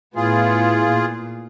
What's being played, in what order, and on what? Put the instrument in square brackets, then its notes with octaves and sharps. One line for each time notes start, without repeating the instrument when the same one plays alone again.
[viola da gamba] A2 B3 E4 [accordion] F4 G#4
[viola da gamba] A#2